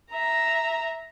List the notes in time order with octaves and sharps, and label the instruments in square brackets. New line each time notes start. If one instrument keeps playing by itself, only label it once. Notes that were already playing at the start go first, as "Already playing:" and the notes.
[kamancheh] E5 A#5